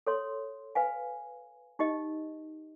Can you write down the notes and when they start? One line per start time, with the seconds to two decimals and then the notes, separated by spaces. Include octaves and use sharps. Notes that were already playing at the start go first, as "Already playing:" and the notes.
0.07 A4 C#5 C6
0.75 B4 F5 G#5
1.79 D#4 G4 D#5